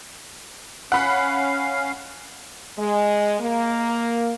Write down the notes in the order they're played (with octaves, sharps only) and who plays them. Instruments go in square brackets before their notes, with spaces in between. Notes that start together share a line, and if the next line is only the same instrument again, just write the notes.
[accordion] C#4 F5 [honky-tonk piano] F#5 B5
[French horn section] G#3
A#3